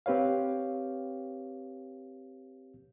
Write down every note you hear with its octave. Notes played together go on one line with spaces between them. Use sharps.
C4 G4 B4 C#5 F5